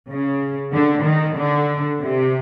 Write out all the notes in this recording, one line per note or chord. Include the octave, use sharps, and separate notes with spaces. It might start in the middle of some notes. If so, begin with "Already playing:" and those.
C#3
D3
D#3
D3
C3